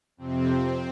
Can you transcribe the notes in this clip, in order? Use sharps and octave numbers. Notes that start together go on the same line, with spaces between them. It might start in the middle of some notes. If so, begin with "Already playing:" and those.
F2 C3 C4